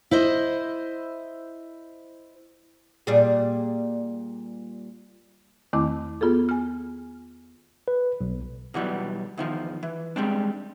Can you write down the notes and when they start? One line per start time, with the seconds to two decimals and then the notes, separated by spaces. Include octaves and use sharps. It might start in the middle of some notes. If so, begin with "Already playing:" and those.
0.11 E4 C5 D#5
3.07 A#2 G3 G#4
5.73 E2 D#3 A3 C4 E4 D6
6.21 B3 F4 G#4 A4
6.49 G#5 F6
7.88 B4
8.21 B1
8.74 B2 E3 F#3 G3
9.37 E2 D#3 F3
9.83 E3
10.16 G3 G#3 C4 D4